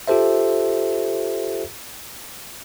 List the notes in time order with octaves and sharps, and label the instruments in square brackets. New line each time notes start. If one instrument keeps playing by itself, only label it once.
[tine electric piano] F4 G4 A4 C5 E5